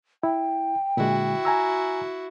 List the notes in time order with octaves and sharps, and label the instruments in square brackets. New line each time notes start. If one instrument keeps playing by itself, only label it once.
[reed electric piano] E4 [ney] G5
[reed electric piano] A#2 D3 G#3 [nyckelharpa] E4 F#4
[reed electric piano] G#5 A#5 E6